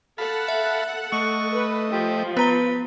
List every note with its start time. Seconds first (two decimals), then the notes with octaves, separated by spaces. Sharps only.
0.18 A4 F5 F#5 A5 B5
0.48 E5
1.12 A3 D#5 C#6
1.56 B4
1.92 F3 G4
2.37 B3 B4 A#5 G7